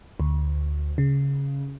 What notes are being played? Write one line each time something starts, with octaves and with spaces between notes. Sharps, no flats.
D2
C#3